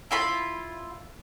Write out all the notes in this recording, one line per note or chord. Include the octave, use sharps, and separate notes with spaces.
E4 F4 B5